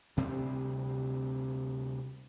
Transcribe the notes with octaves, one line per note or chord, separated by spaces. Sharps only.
D2 C3 G3 C4